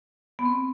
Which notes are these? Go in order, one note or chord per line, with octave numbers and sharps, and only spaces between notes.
B3
C4